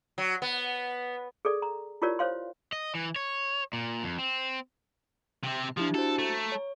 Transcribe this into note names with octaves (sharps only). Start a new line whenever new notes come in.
F#3
B3
G#4 A4 D5
A#5
E4 F4 G4 A#4 C#5 D5
C5 C#5 F5 C6
D#5
E3
C#5
A#2
F2
C4
C3 C4
F3 D4 E4 G4
F#4 A4 C5
A3 A#5
C#5